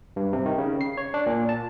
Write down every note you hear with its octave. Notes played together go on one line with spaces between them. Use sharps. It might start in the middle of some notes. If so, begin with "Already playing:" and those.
G2
C3
D#3
C#3
C7
C#5
D4
A#2
A5